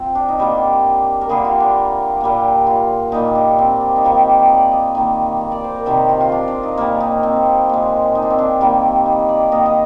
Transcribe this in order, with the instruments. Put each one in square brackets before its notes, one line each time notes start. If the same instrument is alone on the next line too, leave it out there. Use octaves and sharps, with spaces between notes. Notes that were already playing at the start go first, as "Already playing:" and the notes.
Already playing: [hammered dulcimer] C4 F4
D4
D#4
D3 G3 A#3 D4
A#4
D3 G3 A#3 G#4
F4
D4
A#2 G3 A#3
F4
A#2 G3 A#3 D#4
D4
C4
D4
D#4
D#3 G3 A#3 F4
G4
D5
D#5
D#3 G3 A#3
D5
D5
C5
A#4
C3 D#3 G3 G#4
F4
F4
D4
D4
D#4
A#2 G3 A#3 F4
D#4
C4
A#2 G#3
D#4
D4
C4
D4
D#3 G3 A#3
D#4
D5
D#3 A#3 D#5
D#5